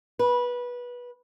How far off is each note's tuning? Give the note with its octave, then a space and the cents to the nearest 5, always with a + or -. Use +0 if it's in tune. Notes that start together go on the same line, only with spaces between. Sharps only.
B4 -20